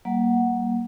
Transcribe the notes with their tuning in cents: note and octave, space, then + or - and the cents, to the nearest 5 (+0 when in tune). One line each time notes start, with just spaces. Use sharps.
G3 -30 A#3 +10 F#5 +0